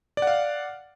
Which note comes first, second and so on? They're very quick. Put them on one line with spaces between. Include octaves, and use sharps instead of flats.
D5 F#5 F5